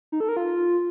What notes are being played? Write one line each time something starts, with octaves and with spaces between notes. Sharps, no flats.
D#4
A4
A#4
F4